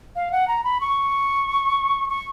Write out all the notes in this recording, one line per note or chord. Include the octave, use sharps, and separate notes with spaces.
F5
F#5
A#5
B5
C#6
C#6